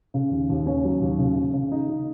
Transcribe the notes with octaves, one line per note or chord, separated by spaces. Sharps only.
C#3
D#2
D#2
C#4
F#3
D#2
C#3
C#3
C#3
D#4
D#4